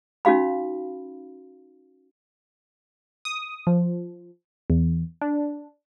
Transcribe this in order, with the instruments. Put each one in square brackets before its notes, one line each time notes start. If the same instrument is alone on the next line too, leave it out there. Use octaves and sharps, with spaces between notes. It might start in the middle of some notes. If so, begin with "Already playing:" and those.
[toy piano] C#4 D#4 F#4 F5 B5
[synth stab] D#6
F3
E2
D4